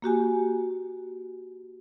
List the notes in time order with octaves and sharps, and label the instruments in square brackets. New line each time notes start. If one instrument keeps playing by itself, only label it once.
[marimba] A#3 F#4 G4 G#5